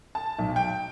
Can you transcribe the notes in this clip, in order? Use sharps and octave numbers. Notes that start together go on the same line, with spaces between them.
A5
B1
G5